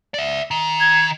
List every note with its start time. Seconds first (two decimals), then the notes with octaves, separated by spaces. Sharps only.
0.14 D5 E5
0.51 D#3
0.80 G#6